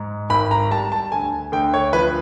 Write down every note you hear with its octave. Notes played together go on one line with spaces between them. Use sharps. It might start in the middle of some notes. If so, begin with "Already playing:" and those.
Already playing: G#2
G#1 B5
A#5
G3 A5
A5
D2 G#5
D2 G5
C#5
F3 B4